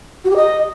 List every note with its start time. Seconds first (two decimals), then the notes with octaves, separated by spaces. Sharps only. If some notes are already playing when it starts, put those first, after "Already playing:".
0.25 F#4
0.30 G4
0.36 D#5